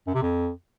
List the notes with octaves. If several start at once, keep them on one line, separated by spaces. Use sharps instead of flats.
F#2
C3
F2